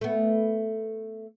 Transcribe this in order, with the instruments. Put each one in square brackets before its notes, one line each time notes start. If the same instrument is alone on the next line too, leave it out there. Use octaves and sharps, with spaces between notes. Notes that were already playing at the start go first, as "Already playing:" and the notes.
[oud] A3 B3